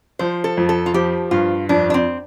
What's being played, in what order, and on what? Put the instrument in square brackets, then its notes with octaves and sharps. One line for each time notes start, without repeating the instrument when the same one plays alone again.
[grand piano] F3 [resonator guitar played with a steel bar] C5
[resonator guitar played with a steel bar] A4
[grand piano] F2
[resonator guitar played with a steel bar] A4
F4
[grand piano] F3 [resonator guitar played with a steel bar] G4
[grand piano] G2 [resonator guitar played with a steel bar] F4
[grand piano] F2 [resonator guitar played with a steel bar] D4
[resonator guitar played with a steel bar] D4
C4